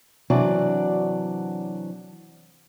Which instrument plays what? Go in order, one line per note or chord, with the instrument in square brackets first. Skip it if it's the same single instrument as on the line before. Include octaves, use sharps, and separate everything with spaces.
[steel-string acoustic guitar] C3 E3 F#3 D4 F#4 D5